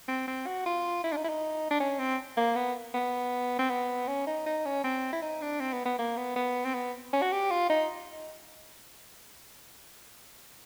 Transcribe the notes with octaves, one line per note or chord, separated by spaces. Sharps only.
C4
C4
F#4
F4
E4
D4
D#4
E4
D#4
D4
C#4
C4
A#3
B3
B3
C4
B3
C#4
D#4
D#4
C#4
C4
E4
D#4
D4
C4
B3
B3
A#3
B3
B3
C4
B3
C#4
F#4
G4
F4
D#4